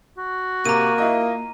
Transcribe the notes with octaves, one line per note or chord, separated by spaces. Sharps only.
F#4
C3 A#3 A#5 D#7
E4 F4 D#5